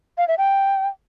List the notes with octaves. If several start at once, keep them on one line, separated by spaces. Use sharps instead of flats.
F5
E5
G5